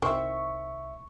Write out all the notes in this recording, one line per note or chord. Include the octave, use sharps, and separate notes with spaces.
C2 D#3 C4 E5 C#6